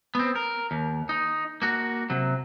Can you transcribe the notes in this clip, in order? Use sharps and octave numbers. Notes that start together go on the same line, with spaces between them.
B3 C4
A#4
D#2
D#4
A#3 F#4
C3 F#3